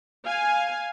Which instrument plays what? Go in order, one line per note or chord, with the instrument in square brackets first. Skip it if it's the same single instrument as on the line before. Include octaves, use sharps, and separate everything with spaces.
[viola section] F5 G#5